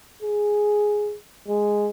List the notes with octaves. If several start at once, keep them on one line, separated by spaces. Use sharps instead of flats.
G#4
G#3